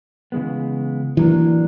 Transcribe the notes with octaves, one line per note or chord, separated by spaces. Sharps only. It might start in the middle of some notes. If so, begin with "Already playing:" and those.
C#3 E3 G#3 B3
A2 E3 F#3 A#3 D4